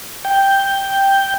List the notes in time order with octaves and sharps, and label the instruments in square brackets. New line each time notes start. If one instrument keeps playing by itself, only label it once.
[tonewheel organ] G5